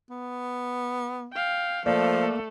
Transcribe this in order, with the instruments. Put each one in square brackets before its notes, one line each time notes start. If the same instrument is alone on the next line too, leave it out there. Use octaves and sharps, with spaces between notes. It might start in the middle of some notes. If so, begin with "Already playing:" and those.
[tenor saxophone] B3
[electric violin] F5 G5
[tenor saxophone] F3 [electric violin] A3 A4 [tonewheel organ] A#3 [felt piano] D5